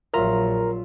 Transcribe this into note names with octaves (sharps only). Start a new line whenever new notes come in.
A#1 F#3 F4 A#4 E5 A#5